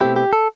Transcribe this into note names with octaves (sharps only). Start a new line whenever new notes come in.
B2 A3 C4 E4 G4
G4
A4